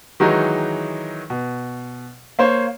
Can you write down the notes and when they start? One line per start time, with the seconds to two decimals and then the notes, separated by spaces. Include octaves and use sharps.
0.20 D#3 E3 F#3 G#3 D#4
1.30 B2
2.39 A#3 C5 C#5